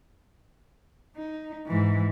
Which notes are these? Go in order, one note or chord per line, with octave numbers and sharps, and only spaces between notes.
D#4
G#2 E3